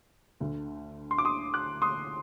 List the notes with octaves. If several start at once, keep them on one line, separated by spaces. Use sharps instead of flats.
D2 D3 A3
C6
D6
C6 D#6
D6 F#6
C6 D#6